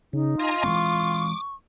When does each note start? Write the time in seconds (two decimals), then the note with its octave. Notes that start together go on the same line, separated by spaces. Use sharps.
0.13 C#3 D#4
0.40 F4 D#5 G#5 A#5
0.64 E3 G#3 C4 C#6 D6